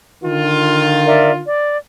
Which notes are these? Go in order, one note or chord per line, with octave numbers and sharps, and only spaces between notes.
D3 D#3 F4
A#4 D5 E5
D5